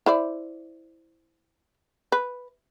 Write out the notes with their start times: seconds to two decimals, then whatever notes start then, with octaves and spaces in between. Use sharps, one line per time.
0.06 E4 C5 D5
2.12 B4